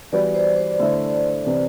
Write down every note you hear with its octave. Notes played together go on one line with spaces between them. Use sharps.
E3 G3 B3 F#4 B4 D5
C5
C5
D3 A3 E4
C3 E3